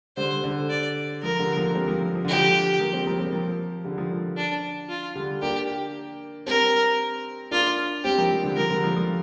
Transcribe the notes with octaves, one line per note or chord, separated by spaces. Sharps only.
D3 G3 C5
D3
D5
F3 A#4
D3 G3
F3 A#3
G3 C4
F3 A#3
F3
F3
D3 G4
F3
F3 A#3
G3 C4
F3 A#3
G3 C4
F3 A#3
D3 G3
F3
F3
D4
F4
D3 G3
A#3 D4 G4
G3 C4 A#4
A#3 D4 F4
G3 C4 G4
F3 A#3
F3
D3 G3
F3 A#4
D3 G3
F3 A#3
F3